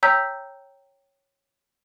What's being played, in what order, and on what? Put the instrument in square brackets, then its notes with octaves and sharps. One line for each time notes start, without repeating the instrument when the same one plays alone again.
[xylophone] C#5 G5 A#5 E6 G6 B6